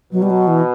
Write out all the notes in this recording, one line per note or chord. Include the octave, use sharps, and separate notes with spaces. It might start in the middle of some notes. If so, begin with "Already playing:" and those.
B2 F#3
G3
F#3
E3